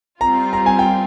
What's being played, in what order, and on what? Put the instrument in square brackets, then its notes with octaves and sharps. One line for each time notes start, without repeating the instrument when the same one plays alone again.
[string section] G3 C4 F4 [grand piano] A#5
[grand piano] A#5
G#5
G5